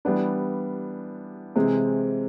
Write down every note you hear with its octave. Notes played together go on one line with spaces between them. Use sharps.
E3 G3 B3 D4
C3 E3 G#3 C4